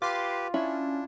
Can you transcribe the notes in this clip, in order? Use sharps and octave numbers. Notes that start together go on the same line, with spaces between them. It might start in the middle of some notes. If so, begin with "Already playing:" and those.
F4 G4 B4 C6 D6
C#4 D4 E4